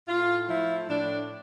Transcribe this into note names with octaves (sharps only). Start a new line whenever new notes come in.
A2 F4
F3 A3 E4
A2 D4